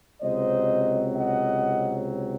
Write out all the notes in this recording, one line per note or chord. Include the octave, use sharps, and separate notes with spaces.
C#2 C3 F#3 C4 C5 D#5
D#5 F#5